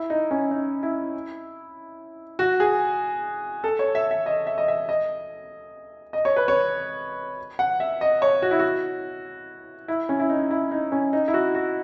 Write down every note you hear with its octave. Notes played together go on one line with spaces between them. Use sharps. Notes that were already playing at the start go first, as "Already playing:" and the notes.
Already playing: E4
D#4
C#4
D#4
E4
F#4
G#4
A4
C#5
E5
E5
D#5
E5
D#5
E5
D#5
D#5
C#5
B4
C#5
F#5
E5
D#5
C#5
F#4
E4
F#4
E4
C#4
E4
D#4
E4
D#4
C#4
D#4
E4
F#4
F#4